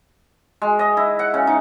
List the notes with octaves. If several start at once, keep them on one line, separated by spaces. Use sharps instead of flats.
G#3
D#5
E4
F#5
C#3
D#4